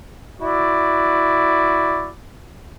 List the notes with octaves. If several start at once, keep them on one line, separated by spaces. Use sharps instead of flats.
E4 F#4 D5